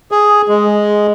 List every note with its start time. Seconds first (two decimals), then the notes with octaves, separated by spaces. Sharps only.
0.11 G#4
0.48 G#3